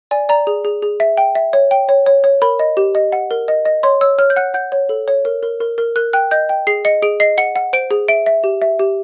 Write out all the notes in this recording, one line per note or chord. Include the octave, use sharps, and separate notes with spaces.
D5 G#5
D5 A#5
G#4
G#4
G#4
E5
G5
E5
C#5
G5
C#5
C#5
C#5
A#4 B5
D#5
G4
D#5
F#5
A#4
D#5
D#5
C#5 C6
C#5 E6
C#5 F6
G6
F#5 F#6
F#5 G6
C#5
A4
C#5
A#4
A#4
A#4
A#4
A#4 F#6
G5 F#6
D#5 G6
G5
G#4 C7
D#5 C#7
G#4 D7
D#5 C7
F#5 C#7
F#5
C5 D7
G#4
E5 D7
E5
G4
E5
G4